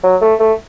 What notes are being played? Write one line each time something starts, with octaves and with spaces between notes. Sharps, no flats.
F#3
A3
A3